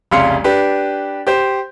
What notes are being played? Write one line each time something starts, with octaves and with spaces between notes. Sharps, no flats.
F1 C2 C#3 F5 C6 C#7
D4 G4 B4
G4 C5